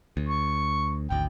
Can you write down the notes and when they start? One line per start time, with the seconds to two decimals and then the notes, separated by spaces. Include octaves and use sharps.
0.17 D2
0.29 C#6
1.10 G#1 D2 G5